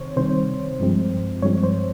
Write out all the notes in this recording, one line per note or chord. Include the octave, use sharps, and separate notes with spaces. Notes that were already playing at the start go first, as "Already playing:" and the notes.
Already playing: C3 D#3 C4 C5 C#5
C3 D#3 G3 C4 C5
G2 F3 G#3 C4
G2 F3 G#3 C4 C#5
C5